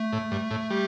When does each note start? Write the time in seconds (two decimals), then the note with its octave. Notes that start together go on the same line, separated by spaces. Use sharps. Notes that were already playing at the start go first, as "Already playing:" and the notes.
Already playing: A3
0.13 A2
0.31 G2
0.51 A2
0.70 G3